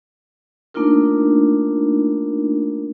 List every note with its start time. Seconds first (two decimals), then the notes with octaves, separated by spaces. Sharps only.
0.74 A3 A#3 D4 D#4 F4 A#4